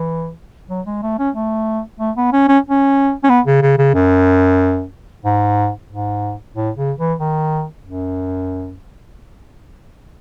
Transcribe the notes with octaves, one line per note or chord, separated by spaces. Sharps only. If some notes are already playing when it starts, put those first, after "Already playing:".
Already playing: E3
F#3
G#3
A3
C#4
A3
A3
B3
C#4
C#4
C#4
C#4
B3
C#3
C#3
C#3
F#2
G#2
G#2
A2
C#3
E3
D#3
F#2